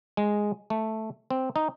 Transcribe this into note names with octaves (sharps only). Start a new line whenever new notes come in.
G#3
A3
C4
D#4